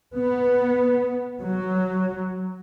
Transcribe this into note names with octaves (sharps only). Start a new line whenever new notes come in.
B3
F#3